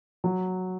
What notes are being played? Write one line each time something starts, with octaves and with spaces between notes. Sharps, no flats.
F#3